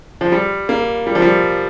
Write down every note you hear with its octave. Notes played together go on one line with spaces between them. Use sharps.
F3
G3
A#3
G3
F3
G3